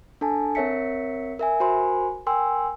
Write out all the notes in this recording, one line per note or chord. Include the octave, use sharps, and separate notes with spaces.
D4 A4 G#5 A5
C4 A#4 C#5 E5 B6 C#7
A#4 E5 G#5
F#4 A#4 C5 G#5 B5 C6
A#4 G5 G#5 C6 E6